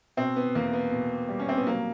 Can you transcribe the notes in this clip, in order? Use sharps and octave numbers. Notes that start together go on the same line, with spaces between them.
B2 C4
B3
E2 A#3
B3
B2
G3
C#4
C4
B3
F#3 A#3